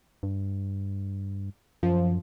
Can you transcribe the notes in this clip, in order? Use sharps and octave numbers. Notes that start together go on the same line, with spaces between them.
G2
F#2 F3